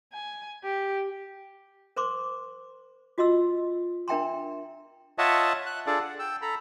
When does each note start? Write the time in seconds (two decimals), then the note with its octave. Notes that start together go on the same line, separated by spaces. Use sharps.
0.13 G#5
0.63 G4
1.96 A#4 C5 C6 D6
3.18 F4 F#4 D#5 C6 E6
4.08 D4 A#4 E5 G5 A#5 C6
5.18 F4 C#5 D#5 E5 F#5 A5
5.66 F#6
5.86 D4 F4 G#4 A4 D5
6.00 F#5
6.19 G5 E6
6.42 A4 A#5 B5